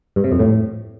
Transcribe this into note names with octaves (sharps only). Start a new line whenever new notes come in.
G2
C3
F2
A2